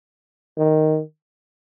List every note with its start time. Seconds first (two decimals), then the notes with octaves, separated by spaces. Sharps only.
0.58 D#3